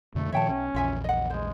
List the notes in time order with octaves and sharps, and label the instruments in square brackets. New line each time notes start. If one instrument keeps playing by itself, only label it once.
[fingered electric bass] F2 B2 D3 [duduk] A3
[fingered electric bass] A#2 D#3 F3 [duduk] C#5 [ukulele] E5 G5 A5
[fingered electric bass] B1 [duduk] C#4
[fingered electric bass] A#1 E2 [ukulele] F4 E5 G#5
[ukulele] D#5 F#5
[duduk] G#3 [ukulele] C5